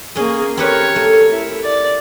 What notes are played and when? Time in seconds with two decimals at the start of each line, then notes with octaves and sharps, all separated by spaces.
0.16 A#3 C#4 G#4 D#5
0.57 C4 G4 A#4 B4 C#5
0.96 A3
1.31 E4
1.63 D5